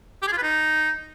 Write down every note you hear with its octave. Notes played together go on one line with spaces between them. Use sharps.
G4
G#4
F4
B4
D#4